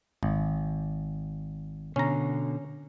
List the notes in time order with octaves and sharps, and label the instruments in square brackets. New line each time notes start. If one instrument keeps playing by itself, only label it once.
[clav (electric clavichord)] G#1
[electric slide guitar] B2 D3 [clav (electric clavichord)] C#4 A#5